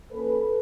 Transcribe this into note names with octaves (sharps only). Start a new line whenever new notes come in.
F3 A#3 C#4 A4 B4